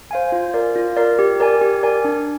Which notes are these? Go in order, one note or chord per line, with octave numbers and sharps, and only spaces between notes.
C5 F5 G#5
F4
A#4 D5
F4
A#4 D5
G4
A#4 D5 G#5
G4
A#4 D5 G#5
D4